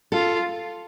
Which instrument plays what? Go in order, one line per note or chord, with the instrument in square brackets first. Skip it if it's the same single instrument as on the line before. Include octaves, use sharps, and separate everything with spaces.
[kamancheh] F4 [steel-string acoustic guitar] A4